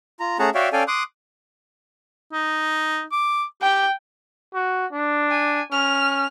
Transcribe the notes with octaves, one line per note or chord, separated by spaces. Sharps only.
F4 A#5
A3 C#4 G#4 F#5 A5 A#5
F#4 C#5 D5 E5 F5 G5
C#4 A4 D5 F5 G5 G#5
C6 D6 D#6 F#6
D#4
D6
G4 G5
F#4
D4
G#5
C#4 F6